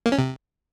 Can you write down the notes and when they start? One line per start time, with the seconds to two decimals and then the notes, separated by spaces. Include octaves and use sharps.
0.06 A#3
0.12 C#4
0.18 C3